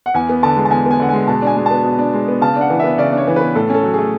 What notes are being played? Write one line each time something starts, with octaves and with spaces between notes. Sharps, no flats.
F#5
E2 G#5
B3
D3 A5
G#3
A5
E2 G#5
B3 G#5
D3 F#5
G#3 G#5
B2 A5
D4 G#5
G#3
B3 A5
B2
D4
G#3
B3
C#3 A5
D4 F#5
E3
B3 E5
C#3 D5
D4 C#5
E3
B3 B4
A2 A4
C#4 A4
F#3
A3 G#4